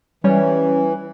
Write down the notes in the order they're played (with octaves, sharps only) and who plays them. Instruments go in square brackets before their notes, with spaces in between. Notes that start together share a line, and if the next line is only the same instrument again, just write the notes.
[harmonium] E3 [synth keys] G3 C#4 C#5